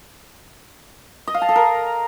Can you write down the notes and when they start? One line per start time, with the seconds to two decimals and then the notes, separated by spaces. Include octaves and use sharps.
1.27 D#5
1.34 F5
1.42 A5
1.49 A4
1.56 A#4